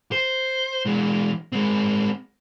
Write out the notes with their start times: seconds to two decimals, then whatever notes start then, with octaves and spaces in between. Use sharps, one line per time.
0.12 C5
0.86 E3 G#3
1.52 G#3 C4